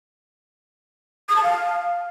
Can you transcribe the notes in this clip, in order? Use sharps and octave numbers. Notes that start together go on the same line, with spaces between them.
D#6
A5
F5